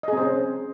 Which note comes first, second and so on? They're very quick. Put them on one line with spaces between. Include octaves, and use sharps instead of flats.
D#5 G#4 C4 C5 C#4